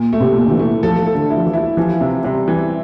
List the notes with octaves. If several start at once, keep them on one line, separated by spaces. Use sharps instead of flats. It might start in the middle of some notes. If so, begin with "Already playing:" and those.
Already playing: A#2
A3
C3
A#2
D3
E3
A3
F3 A4
A4
D3
E4
F3
E3
E4
E3 F3
C3
C3 G3
E3